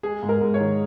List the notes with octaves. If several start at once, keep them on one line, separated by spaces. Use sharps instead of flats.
G#3 G#4
G#2
A#4
G#2
C#5
D#3